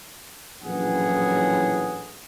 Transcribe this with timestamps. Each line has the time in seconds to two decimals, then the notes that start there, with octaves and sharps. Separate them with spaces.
0.62 A#1 F#2 A2 E3 G#4 F#5